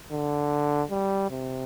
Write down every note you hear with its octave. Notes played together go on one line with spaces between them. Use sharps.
D3
G3
C3